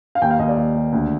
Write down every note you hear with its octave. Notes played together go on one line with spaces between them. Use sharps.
F5
D#2 G5
F5
D#2 D#5
D5
D#2
D#2
D2